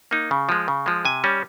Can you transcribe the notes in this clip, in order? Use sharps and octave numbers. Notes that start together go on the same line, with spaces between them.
A#3 D#4
C#3
F3 G#3
C#3
F3 G#3
C3 G#5
G3 C#4